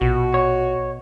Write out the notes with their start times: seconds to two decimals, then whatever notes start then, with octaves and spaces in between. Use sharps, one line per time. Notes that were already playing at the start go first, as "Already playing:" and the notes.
0.01 A#1 B2 F#4
0.34 C#5